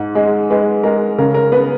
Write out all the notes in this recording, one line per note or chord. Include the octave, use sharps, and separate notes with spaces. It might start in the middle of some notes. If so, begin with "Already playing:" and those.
Already playing: G#2
G#3
G#3 B4
G#3 A#4
C#3 A#4
A#4
B3 B4